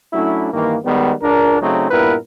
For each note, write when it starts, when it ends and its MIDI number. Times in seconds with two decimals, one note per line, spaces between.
0.13 0.48 54
0.13 0.48 57
0.13 0.48 61
0.13 0.48 62
0.13 0.48 64
0.53 0.76 43
0.53 0.76 51
0.53 0.76 52
0.53 0.76 58
0.85 1.13 51
0.85 1.13 55
0.85 1.13 56
0.85 1.13 59
1.22 1.57 37
1.22 1.57 62
1.22 1.57 70
1.61 1.90 49
1.61 1.90 54
1.61 1.90 57
1.61 1.90 60
1.61 1.90 61
1.61 1.90 63
1.91 2.14 43
1.91 2.14 46
1.91 2.14 59
1.91 2.14 64
1.91 2.14 70
1.91 2.14 71